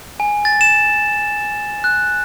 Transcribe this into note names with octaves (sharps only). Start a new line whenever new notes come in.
G#5
A6
E7
F#6